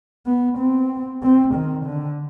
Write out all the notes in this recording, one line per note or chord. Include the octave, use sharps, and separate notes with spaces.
B3
C4
C4
D#3
D3